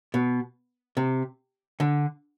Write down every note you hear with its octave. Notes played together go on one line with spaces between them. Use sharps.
B2
C3
D3